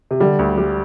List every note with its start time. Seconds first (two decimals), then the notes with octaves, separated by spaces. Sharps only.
0.11 C3
0.20 D3 G3
0.39 D2
0.57 G3